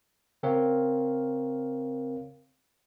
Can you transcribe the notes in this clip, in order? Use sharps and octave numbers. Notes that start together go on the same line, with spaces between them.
C#3 C4 A#4 C#5 F5